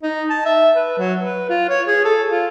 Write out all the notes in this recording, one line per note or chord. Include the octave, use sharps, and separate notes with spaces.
D#4
A5
E5
B4
F#3
B4
F4
C#5
G#4
A4
F4